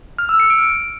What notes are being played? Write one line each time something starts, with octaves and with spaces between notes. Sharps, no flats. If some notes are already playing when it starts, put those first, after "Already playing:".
F6
E6
C#7
D7